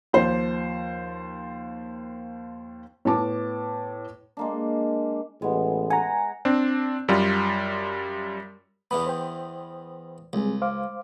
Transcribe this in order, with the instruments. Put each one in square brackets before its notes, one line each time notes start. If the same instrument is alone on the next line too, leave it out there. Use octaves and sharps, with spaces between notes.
[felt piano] D#2 F3 C5
A2 B3 A5 D6
[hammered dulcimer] G#3 A#3 D4
[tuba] A1 [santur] G#3 B3
[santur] F#5 [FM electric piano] G#5 A#5
[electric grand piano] C4 D4
F#2 G3 F4
[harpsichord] E2 E3 B3 [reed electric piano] B5
[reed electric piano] C5 G5
[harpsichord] C#2 [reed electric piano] G3 C4 G#4
[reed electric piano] C5 F5 D6